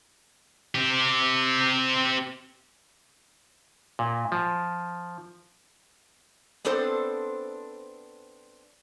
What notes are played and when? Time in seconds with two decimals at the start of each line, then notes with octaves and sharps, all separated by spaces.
0.75 C4 G4
3.99 A#2
4.32 F3
6.65 B3 C4 D4 A4 C5